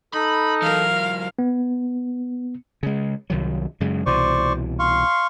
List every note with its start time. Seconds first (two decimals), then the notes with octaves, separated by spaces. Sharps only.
0.14 D#4 A4 B5
0.62 E3 F#3 A#4 F5
1.39 B3
2.83 C#3 G#3
3.30 C2 D#3 F#3
3.80 F#2 C#3 G#3
4.06 C2 B2 E3 C5 D5 C#6
4.79 F5 C6 C#6